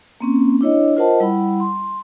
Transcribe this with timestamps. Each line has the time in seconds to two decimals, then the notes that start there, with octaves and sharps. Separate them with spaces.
0.21 A#3 C4 C#4
0.61 D4 E4 C#5 D#5
0.97 F4 A#4 C5 D#5 F#5 A5
1.20 G3 E4 F#5 B5
1.60 C6